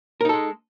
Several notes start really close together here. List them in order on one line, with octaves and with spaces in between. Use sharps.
A#4 D#4 A4 G#3